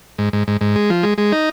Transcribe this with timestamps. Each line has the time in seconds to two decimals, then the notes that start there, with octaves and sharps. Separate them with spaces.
0.18 G#2
0.33 G#2
0.48 G#2
0.61 G#2
0.76 G#3
0.90 F3
1.03 G#3
1.18 G#3
1.32 D#4